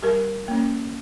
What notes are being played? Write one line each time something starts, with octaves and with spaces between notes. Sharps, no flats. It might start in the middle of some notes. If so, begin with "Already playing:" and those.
G3 G4 A#4
A#3 C#4